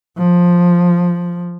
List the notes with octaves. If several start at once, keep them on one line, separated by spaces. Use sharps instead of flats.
F3